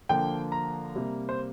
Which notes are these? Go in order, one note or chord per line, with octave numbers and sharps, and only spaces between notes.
D3 F3 A#3 G5
A#5
C3 G3 A#3
C5